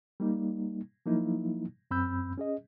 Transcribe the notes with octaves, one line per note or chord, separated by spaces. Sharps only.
G3 A#3 D#4
F3 F#3 A#3 D#4 E4
F#2 C4 B5 E6 G6
C#4 G#4 D#5